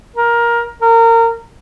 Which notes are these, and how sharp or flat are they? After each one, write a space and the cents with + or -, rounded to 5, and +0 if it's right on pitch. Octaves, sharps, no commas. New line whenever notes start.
A#4 +15
A#4 -25